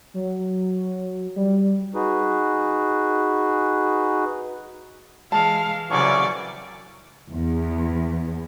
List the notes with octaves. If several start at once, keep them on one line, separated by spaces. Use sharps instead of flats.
F#3
G3
D#4 F#4 G#4 B4
E3 G#3 F5 A5
C2 C#3 E3 F#3 C#4 D5 C#6
E2